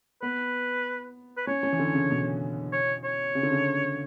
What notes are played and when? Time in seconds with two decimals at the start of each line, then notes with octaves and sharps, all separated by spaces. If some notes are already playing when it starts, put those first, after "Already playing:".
0.22 B3 B4
1.37 B4
1.47 C#4 C#5
1.63 C#4
1.73 E3
1.79 D3
1.94 C#3
2.11 B2
2.72 C#5
3.04 C#5
3.35 C#3
3.43 D3
3.52 C#3